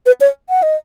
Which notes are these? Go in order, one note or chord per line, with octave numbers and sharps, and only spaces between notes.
B4
C#5
F#5
D#5